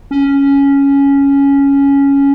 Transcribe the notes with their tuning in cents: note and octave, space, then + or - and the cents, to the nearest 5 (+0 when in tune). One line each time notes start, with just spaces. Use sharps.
C#4 +5